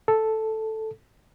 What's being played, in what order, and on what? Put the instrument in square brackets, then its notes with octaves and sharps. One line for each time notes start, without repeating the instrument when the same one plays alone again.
[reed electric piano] A4